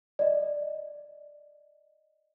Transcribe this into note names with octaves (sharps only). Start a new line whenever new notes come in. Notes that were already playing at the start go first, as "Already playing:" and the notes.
D5 D#5